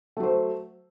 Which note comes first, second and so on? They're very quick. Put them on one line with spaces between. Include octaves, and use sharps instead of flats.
A3 F#3 C5